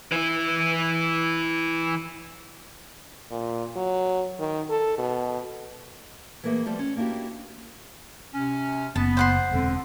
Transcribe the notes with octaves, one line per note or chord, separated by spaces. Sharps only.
E3 E4
A#2
F#3
D#3
A4
B2
E3 A3 A#3 G#4 E5 F#5
F3 G3 A3 B3
C#4
A#3 D4 E4 F#4 G4
C3 C#4
F#1 B3 A5
C5 F#5 C6
E1 D3 C4